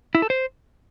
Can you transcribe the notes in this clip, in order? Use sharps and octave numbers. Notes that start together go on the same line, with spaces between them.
E4
A4
C5